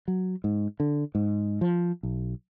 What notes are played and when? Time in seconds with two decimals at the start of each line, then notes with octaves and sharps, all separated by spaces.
0.08 F#3
0.44 G#2
0.80 D3
1.15 G#2
1.61 F3
2.03 B1